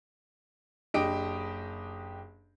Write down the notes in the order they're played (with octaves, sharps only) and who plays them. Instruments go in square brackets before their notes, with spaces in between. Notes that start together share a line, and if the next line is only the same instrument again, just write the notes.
[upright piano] F#1 D4 G4 D#5 D7